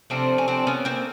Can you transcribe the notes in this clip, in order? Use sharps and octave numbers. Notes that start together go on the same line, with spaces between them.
C3 F3 A3 C4 D4
C#4
C4 D4
B3 C#4
A#3 C4